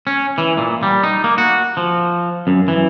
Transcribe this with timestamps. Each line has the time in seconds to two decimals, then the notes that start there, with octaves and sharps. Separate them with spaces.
0.07 C#4
0.38 E3
0.57 A#2
0.83 G3
1.03 D#4
1.24 A#3
1.38 F#4
1.77 F3
2.47 F#2
2.68 E3